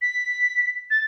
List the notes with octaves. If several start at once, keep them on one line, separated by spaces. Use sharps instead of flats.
B6
A6